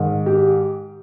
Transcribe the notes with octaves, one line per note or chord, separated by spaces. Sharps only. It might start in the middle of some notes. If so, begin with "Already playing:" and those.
Already playing: G#2 D#3
G4